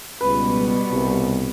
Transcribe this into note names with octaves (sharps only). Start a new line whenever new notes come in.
C#2 B2 G3 B3 B4
C2